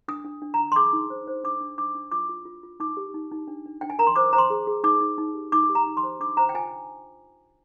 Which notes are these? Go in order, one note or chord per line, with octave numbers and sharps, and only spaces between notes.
D4 D#6
D4
D4
A#5
D4
C6
G#4 D6
D#4
C5
C5
D4 D6
D4
D4 D6
D4
F4 D6
F4
F4
F4
D#4 D6
G4
D#4
D#4
D4
D4
D4 G5
G#5
A#4 A#5
C6
C5 D6
C5 A#5
C6
G#4
G#4
D#4 D6
D#4
D#4
G4
D#4 D6
G4
A#5
D#4
C6
C5
D4 D6
C5 A#5
G5
F4 G#5